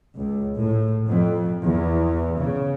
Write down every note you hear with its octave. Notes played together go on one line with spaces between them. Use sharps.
C#2
A2
F2
E2
C#3